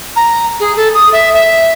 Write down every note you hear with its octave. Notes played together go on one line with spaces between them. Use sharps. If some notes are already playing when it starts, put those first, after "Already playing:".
A#5
G#4
A4
D#6
E5
E5